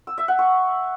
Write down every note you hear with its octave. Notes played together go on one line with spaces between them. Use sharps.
E6
E5
F#5
C#6